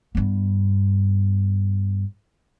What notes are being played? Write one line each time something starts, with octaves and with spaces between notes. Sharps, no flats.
G2 B3